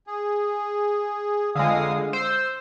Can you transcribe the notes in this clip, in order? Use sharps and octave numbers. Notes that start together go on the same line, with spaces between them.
G#4
F2 D3 G#3 F5 D#6
C5 E6